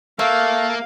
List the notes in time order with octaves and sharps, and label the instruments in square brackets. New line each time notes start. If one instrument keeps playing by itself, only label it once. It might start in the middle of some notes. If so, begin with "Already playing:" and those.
[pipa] A3 [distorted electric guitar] A#3 [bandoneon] A4 [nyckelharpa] F5